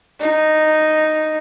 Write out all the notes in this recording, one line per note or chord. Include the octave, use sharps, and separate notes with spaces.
D#4